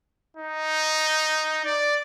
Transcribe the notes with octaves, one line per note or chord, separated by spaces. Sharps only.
D#4
D5